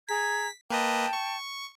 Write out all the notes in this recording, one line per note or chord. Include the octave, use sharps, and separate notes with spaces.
G#4 A#5 G#6 B6
A#3 B4 D#5 G5 A5
C#6